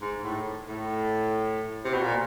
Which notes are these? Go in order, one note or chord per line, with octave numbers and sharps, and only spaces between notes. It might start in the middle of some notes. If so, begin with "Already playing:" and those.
G#2
A2
A2
C3
B2
A#2